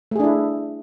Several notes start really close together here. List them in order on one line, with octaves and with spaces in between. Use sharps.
A3 G#4 D4 E4